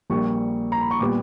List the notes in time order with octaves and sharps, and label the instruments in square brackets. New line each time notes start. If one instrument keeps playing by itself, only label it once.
[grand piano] A#1 A#2 G3 A#3 C#6
A#5
B5
C#6
A#2 G3 B3 D6